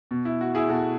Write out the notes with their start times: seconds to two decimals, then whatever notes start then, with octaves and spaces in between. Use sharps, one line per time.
0.11 B2
0.25 E4
0.41 F#4
0.55 E4 G#4
0.69 B2 F#4 A4